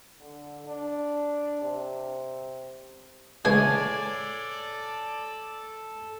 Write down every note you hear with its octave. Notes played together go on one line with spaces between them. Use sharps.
D3
D4
C3
C#3 E3 G#3 A4 C#5 D5 G#5